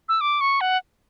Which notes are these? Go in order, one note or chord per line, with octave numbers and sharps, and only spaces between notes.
E6
D6
C#6
F#5